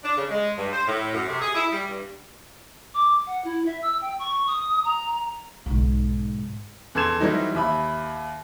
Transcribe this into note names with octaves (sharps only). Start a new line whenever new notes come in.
D4
C#3
G#3
G2
C5
A2
F#2
C3
G#4
E4
G3
G2
D6
F#5
E4
E5
E6
G5
C#6
D#6
A#5
B1 G#2
E2 A4 C6 G#6 E7
E3 F#3 G3 C4 D#4
D#2 E5 B5